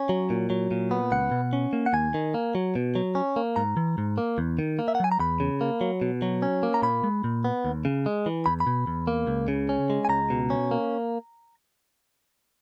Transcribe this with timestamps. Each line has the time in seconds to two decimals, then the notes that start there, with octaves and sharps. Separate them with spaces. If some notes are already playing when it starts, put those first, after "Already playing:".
Already playing: C#4 G#5
0.09 F#3
0.30 A#2
0.50 F#3
0.71 A#2
0.91 B3
1.12 C#2 F#5
1.31 B2
1.53 C#4
1.73 A#3
1.86 F#5
1.93 D#2 G#5
2.14 D#3
2.34 A#3
2.55 F#3
2.75 B2
2.95 F#3
3.15 C#4
3.36 A#3
3.56 G#2 A#5
3.77 E3
3.98 G#2
4.18 A#3
4.38 E2
4.59 D#3
4.79 A#3
4.88 E5
4.95 F#5
5.00 F#3 G#5
5.12 A#5
5.19 E2 B5
5.40 C#3
5.61 A#3
5.81 F#3
6.02 B2
6.22 F#3
6.42 C#4
6.63 A#3
6.74 A#5
6.82 A#2 B5
7.04 G#3
7.24 A#2
7.44 B3
7.65 D#2
7.85 C#3
8.06 G#3
8.26 E3
8.46 E2 B5
8.60 B5
8.67 B2
8.87 E2
9.07 A#3
9.27 C#2
9.48 C#3
9.69 C#4
9.90 G#3
10.05 G#5
10.09 C#2 A#5
10.30 B2
10.50 C#4
10.71 A#3